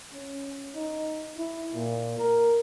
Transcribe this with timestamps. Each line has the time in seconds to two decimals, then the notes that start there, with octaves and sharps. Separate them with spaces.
0.13 C#4
0.75 D#4
1.37 E4
1.74 A#2
2.18 A#4